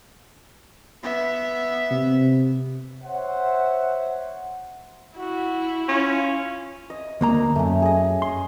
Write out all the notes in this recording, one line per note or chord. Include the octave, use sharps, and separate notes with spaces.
B3 E5
C3
C5 C#5 E5 F#5
E4 F#4
C#4 F4
D#5
D2 A#3 A#5
F#2 A3 C#4
G#4 D#5
C6